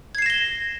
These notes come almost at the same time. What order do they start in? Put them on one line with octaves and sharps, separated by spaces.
G#6 C7 E7 A#6 G7